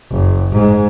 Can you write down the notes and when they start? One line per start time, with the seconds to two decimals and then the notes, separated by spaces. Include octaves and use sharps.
0.11 F#1
0.52 G#2 G#3